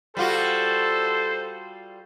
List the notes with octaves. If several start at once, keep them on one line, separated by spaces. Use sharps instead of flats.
G3 F4 F#4 A4 C5